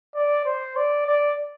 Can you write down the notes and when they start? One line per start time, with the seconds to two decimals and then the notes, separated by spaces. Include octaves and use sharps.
0.15 D5
0.46 C5
0.76 D5
1.06 D5